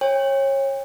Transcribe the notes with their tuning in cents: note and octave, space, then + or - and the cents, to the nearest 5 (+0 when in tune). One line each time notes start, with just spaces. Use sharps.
C#5 -25 G5 +40